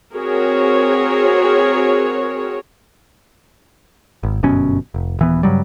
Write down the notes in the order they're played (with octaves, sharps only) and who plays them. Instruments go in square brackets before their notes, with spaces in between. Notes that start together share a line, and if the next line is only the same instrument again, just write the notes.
[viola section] C4 F#4 G#4 A#4 C#5
[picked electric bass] G#1
G1 F#2 B2 C#4
F1
D#1 E3 B3
G2 C#3 F#3 G3